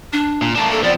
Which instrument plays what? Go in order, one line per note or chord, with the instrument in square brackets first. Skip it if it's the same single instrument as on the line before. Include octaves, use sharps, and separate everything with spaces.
[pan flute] D4
[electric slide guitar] A#2
[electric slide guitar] A3 A#3 D4 [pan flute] A5
[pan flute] A4
[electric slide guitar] F3 B3 C4 [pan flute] D5